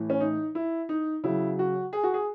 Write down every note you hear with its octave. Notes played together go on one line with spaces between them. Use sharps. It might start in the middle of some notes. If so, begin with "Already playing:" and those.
Already playing: A2 E3
C#4
D#4
E4
D#4
C#3 F#3 E4
F#4
G#4
F#4
G#4